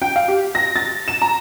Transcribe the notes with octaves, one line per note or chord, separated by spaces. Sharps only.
G5
F5
G4
A#6
A6
E7
A#5